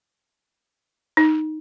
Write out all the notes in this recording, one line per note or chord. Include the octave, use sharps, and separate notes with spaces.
D#4